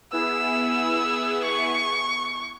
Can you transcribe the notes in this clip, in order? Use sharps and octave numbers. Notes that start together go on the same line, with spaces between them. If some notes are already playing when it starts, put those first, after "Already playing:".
B3 E4 G#4 E6
C#6